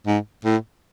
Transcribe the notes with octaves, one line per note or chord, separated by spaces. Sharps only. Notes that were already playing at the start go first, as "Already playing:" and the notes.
G#2
A2